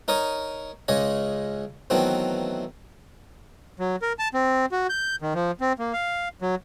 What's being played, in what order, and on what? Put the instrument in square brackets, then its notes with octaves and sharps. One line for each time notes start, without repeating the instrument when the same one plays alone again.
[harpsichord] D#4 A#4 C#5 D#6
C#2 C#3 G#3 C#5 D#5
D#3 E3 F#3 A3 B3 C4
[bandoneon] F#3
A#4
A5
C4
F#4
G6
D#3
F3
C4
A#3
F5
F#3